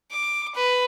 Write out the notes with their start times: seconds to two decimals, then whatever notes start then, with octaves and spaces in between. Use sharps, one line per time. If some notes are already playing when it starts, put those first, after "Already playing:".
0.11 D6
0.55 B4